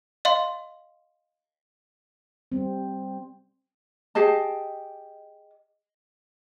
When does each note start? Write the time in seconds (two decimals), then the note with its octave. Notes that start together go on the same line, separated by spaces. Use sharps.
0.25 D#5 F5 C6
2.52 G3 C4
4.15 G4 G#4 D#5 A5